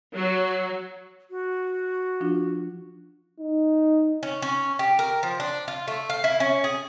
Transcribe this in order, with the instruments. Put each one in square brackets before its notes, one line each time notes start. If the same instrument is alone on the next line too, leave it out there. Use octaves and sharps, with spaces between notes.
[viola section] F#3
[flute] F#4
[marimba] F3 D4 F4
[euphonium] D#4
[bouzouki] C#4
C#4
G4
A#4
F3
D4
F4
A3
F5
E4
C#4
G#4